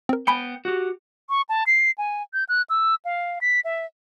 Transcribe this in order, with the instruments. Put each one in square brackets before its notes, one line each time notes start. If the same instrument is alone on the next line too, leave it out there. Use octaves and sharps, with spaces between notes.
[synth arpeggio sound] C4 A#4
[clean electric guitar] B3 G5 [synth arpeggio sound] G#5 B5 C#7
[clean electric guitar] F#4 G4
[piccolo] C#6
A5
C7
G#5
G6
F#6
E6
F5
B6
E5